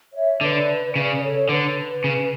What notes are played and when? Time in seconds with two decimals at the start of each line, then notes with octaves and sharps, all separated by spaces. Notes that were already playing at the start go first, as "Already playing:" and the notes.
0.14 C#5 E5
0.41 D3 B4 D5
0.96 C#3 B4 D5
1.22 A4 C#5
1.49 D3 B4
2.04 C#3